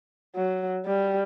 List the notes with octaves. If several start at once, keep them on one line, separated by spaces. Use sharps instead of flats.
F#3
G3